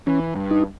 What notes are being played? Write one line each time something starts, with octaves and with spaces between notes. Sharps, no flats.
E3 C#4
G2
D#4